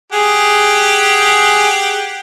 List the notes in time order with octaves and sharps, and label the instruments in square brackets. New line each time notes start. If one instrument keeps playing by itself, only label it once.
[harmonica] G4 F#5 [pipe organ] G#4